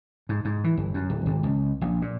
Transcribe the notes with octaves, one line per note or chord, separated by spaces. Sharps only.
G#2
G#2
E3
G1
F#2
D1
G#1
C#2
A#1
A#2